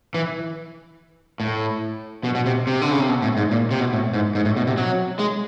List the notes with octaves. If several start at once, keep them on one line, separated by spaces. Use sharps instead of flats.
E3
A2
B2
B2
C3
C3
D3
C#3
C3
B2
A2
G#2
A#2
C3
B2
A2
G#2
G#2
A2
B2
C3
F#3
G#3